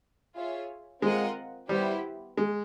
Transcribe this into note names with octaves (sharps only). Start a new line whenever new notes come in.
F4 G#4 C#5 E5
G#3 C4 F4 A#4 D#5 F#5
G3 B3 E4 G4 C5
G#3